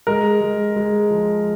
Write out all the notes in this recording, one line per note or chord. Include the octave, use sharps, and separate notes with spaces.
G#3 A#4
G#3
G#3
F3